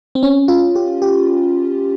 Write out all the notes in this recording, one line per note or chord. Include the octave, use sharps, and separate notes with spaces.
C4
C#4
F4
G4
G4